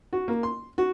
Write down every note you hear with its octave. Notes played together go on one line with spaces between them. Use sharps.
F#4
A#3
C6
F#4